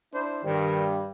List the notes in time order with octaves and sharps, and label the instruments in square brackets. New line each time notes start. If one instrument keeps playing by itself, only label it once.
[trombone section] D4 E4 C5
[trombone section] G2 [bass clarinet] D#3 [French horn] G3